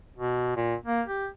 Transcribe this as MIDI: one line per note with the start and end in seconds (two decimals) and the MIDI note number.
0.17 0.53 47
0.56 0.75 46
0.85 1.02 58
1.07 1.27 67